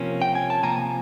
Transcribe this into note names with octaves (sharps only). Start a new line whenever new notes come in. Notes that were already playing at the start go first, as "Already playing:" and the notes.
Already playing: C3 F3 A#3 C#4
G5
G#5
A5
C3 F3 A#3 C#4 G#5 A#5